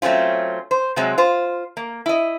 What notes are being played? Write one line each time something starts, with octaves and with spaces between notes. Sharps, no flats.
F#3 A3 C4 C#4 F4
C5
C3 F#3 G#3 C4
F4 C5
A#3
E4 D#5